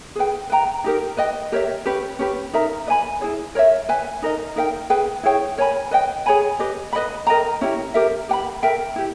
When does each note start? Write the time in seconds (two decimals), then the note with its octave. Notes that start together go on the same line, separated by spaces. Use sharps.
0.16 G#4 B4 G5
0.50 B4 G5 A#5
0.84 D#4 G4 A#4
1.17 B4 D#5 G5
1.52 G4 A#4 C#5 E5
1.85 C#4 G4 B4
2.19 C#4 G4 B4
2.53 D#4 A#4 E5 A#5
2.86 B4 D#5 G#5 B5
3.21 E4 G#4 C#5
3.55 A#4 C#5 E5
3.89 B4 E5 G#5
4.22 D#4 A#4 D#5
4.56 D#4 A#4 E5 G5
4.90 G#4 B4 G5
5.23 E4 G#4 C#5 G5
5.58 A#4 C#5 G#5 B5
5.91 B4 D#5 G5
6.26 G#4 C#5 G#5 B5
6.59 G4 B4 D#5
6.93 B4 D#5 G5 B5
7.27 A#4 D#5 G5 A#5
7.61 C#4 E4 G4
7.94 G4 A#4 E5
8.29 G4 B4 G5 B5
8.63 A#4 E5 G5
8.96 E4 G4